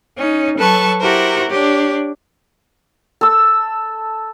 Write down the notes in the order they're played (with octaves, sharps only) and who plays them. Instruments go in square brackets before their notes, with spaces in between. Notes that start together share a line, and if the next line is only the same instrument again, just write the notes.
[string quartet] C#4 D#4
F#3 A4 B4 A5 C#6
E4 F#4 G4 A#4 C5
D4 G4 C#5
[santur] A4 E6